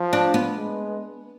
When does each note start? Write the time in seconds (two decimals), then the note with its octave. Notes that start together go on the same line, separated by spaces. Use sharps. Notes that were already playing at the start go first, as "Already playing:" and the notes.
Already playing: F3
0.13 D4
0.34 B3
0.56 G#3